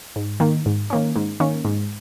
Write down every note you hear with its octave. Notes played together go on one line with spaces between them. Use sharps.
G#2
D#3 A#3
G#2
D#3 A#3 C#4
G#2
D#3 A#3 C#4
G#2